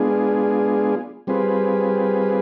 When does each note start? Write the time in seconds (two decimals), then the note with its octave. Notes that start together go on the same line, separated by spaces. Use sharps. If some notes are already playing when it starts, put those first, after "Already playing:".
Already playing: G#3 B3 D4 F4 G#4
1.27 G3 C4 F4 G#4 B4